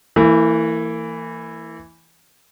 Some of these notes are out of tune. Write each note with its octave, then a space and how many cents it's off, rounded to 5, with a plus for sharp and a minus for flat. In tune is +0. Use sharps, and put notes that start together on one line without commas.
E3 +0 A#3 -45